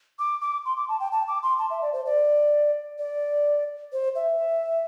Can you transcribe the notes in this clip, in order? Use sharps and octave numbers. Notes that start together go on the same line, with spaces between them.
D6
D6
C6
D6
A5
G5
A5
D6
C6
A5
E5
D5
C5
D5
D5
C5
E5